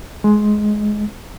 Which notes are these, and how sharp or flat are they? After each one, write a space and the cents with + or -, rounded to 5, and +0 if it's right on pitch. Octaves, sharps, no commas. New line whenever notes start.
G#3 +15